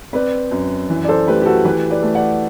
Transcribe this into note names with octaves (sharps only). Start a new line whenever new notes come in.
C4 B4 D5
F#2
E3
D5
A4 C5
A3 G4 B4
G4
F#4 A4
E3 G4 B4
B4 D5
A3
D5 F#5